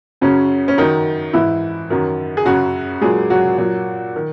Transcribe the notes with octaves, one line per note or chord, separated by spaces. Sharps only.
F#2 C#3 F#3 C#4
C#4
F#2 D#3 F#3 D#4
G#2 E3 E4
F#2 D#3 F#3
G#4
F#2 C#3 F#3 F#4
A#2 F#3 G#3 G#4
F#3 F#4
A#2 F#3
D#3